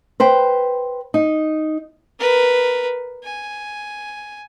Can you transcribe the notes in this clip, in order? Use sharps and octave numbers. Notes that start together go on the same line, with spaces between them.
B4 C5 G5
D#4
A#4 B4
G#5